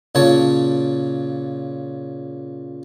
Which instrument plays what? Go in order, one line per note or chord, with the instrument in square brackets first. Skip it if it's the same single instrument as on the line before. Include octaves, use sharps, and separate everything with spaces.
[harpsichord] A#2 C#3 C#5 A5